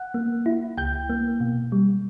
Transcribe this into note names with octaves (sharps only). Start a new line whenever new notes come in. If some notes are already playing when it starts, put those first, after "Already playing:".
Already playing: F#5 F#6
A#3
E4
C#2 G5 G6
A#3
B2
G3